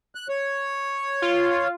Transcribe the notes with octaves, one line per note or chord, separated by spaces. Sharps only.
F#6
C#5
F4